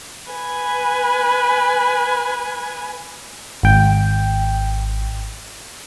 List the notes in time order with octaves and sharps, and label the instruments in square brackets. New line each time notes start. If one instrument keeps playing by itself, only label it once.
[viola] B4 G#5
[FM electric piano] G#1 G5